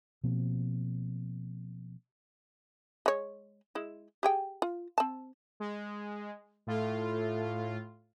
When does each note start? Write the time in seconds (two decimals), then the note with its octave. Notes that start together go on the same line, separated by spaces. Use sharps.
0.23 B2 F3 A#3 C4
3.06 G#3 C#5
3.75 G#3 E4
4.23 G4 G#4 G5
4.62 F4
4.98 C4 A5
5.60 G#3
6.67 A2 A3 F4